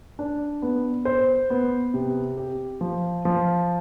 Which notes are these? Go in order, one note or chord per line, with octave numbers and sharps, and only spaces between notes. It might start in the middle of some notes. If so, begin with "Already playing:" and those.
D4
B3
C5
B3
C3
G4
F3
F3